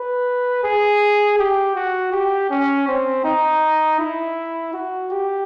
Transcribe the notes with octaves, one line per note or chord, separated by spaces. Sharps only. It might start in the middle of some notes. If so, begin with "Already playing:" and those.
Already playing: B4
G#4
G4
F#4
G4
C#4
C4
D#4
E4
F#4
G4